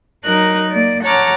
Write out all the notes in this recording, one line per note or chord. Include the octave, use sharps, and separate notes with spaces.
F#3 D#4 A#4 F#6
A#3 D5
C#5 F#5 A5 A#5 D6 F6